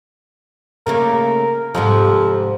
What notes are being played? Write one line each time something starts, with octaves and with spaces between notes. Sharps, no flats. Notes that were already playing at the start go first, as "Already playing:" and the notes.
C#3 A3 A#3 A#4
F2 G#2 C3 F3